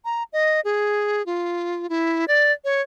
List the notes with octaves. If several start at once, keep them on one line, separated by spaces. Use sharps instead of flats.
A#5
D#5
G#4
F4
E4
D5
C#5